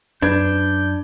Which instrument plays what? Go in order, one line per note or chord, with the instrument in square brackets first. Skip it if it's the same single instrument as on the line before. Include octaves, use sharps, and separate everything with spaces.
[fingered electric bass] F#2 [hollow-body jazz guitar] D4 [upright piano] B4 G#6 [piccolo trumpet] G6